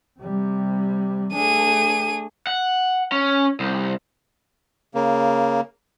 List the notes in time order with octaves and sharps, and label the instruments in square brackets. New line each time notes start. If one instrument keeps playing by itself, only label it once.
[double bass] C3 G3
[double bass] A3 D4 [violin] G#4 D#7
[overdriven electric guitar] F#5
C#4
C2
[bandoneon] C#3 A#3